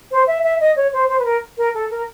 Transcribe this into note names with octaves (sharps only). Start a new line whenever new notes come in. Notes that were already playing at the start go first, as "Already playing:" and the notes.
C5
E5
E5
D#5
C#5
C5
C5
B4
A#4
A#4
A4
A#4